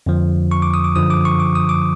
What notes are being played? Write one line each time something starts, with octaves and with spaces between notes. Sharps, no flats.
F2 D3 F3
C#6
D6
D#6
D6
F#2 D3 F3 D#6
D6
C#6
D6
D#6
D6